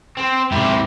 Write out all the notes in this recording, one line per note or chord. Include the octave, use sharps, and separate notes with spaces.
C4
G#2 C3 E4 G4